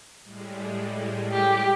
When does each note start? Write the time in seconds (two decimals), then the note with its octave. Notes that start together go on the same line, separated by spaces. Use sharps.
0.22 A2 G3 G#3
1.32 G4